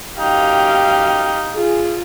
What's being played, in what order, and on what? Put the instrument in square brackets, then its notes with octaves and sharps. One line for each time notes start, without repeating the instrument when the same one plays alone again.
[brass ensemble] F#2 G5 [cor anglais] D#4 [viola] G4 F5
[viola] F4 [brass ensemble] G#4